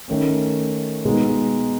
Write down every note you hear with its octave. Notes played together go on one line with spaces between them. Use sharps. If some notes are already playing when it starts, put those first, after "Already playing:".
D#3 A3 C#4
B2 G#3 B3 D#4